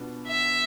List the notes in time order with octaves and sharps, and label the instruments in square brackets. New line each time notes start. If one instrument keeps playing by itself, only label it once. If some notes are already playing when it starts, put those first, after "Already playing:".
Already playing: [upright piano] B2 B3 D4 F4
[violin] E5